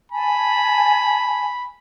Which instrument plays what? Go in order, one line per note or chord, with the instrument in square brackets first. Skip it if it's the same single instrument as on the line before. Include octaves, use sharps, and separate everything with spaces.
[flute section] G#5 A5 [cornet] B5